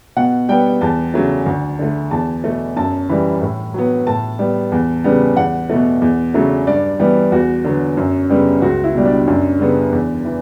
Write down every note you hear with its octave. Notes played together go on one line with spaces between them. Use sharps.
B2 F#5
G3 B3 G5
E2 A5
C#3 F#3 A3
D2
D3 A3
E2 A5
B2 A3
F#2 A5
E3 G3 B5
A2
F#3 B3
A2 A5
G3 B3
E2
C#3 G3 B3
E2 F#5
B2 A3
E2
C#3 F#3 A3
G2 D5
E3 G3 B3
E2 F#4
D3 F#3 B3
F#2
C#3 G3 B3
C#2 F#4
E4
B2 G3
D4
F#2 D4
C#3 G3 B3
E2
E3